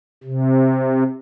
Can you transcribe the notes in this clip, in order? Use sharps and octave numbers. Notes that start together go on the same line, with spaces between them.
C3